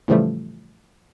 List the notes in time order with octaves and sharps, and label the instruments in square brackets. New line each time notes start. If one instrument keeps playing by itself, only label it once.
[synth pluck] A2 C#3 E3 F3 G3 A3